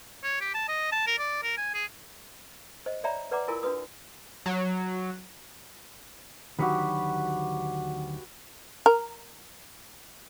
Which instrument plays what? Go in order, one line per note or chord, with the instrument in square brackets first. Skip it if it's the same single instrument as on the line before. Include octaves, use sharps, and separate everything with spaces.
[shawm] C#5
G4
A5
D#5
A5
A#4
D5
A#4
G#5
G#4
[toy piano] C5 D#5
C#5 D5 E5 G5 A#5 B5
B4 D5 F#5 A#5 D6
E4 F4 A#4 G#5 E6
D4 F4 F#4 B4 D#6
[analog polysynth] F#3
[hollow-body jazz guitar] D2 D#3 F#3 [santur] F#4 G4 B4
[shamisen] A#4